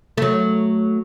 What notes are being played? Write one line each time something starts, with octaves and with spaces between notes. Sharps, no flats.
F#3 A3